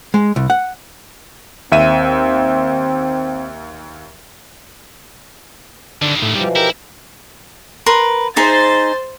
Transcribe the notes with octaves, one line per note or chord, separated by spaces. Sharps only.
G#3
C2
F#5
D#2 C4 E5 D#7
G2 D3 D#3
A2
B2 E3 F3 G3
E4 G4 A#4
A#4 B4 C6
D#4 G#4 C5 E5 A6